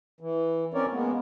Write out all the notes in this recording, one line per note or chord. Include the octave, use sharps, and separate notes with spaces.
E3
C4 C#4 A#4 C#5 D5
G#3 A#3 B3